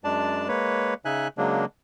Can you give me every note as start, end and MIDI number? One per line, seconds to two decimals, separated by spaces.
0.04 0.48 42
0.04 0.48 56
0.04 0.48 62
0.04 0.48 74
0.04 0.48 81
0.48 0.94 56
0.48 0.94 58
0.48 0.94 71
0.48 0.94 73
1.05 1.28 49
1.05 1.28 63
1.05 1.28 76
1.05 1.28 80
1.05 1.28 90
1.38 1.65 49
1.38 1.65 54
1.38 1.65 56
1.38 1.65 58
1.38 1.65 62